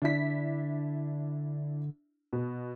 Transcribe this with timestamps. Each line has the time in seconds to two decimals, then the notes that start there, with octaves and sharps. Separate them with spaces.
0.02 D3 D4 E4 B6
2.33 B2